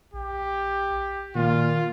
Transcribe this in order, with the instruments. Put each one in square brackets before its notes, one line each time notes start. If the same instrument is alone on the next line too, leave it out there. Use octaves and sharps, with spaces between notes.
[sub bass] A#1 [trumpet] G4
[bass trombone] A#2 [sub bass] D#3 [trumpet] F4